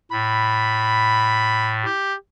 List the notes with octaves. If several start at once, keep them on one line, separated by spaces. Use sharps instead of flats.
A2 B5
G4